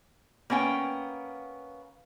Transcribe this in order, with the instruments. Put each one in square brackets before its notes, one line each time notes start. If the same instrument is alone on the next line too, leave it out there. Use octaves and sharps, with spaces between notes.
[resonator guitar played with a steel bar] A#3 B3 C#4 G5